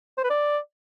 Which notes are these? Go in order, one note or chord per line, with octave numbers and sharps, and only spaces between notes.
C5
B4
D5